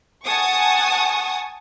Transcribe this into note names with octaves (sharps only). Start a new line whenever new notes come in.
F#5 G#5 A5 C#6 D#6